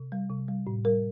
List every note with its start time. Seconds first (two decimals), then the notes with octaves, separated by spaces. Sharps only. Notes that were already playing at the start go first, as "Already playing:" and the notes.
Already playing: C3
0.12 G3
0.30 C3
0.48 G3
0.67 A2
0.85 G3 A#4